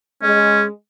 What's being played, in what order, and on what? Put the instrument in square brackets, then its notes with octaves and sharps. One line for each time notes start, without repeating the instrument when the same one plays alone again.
[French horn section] G#3 [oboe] C#4